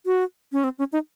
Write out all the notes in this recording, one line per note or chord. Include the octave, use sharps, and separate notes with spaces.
F#4
C#4
C4
C#4
D#4